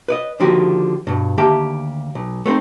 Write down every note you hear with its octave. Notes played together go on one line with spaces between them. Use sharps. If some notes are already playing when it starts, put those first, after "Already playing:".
B4 D5 D#5
D3 D#3 F3 A#3 F#4 G4
G2 B2
D2 D#3 A#3 G4 E5 A5
B1
A3 B3 C4 D#4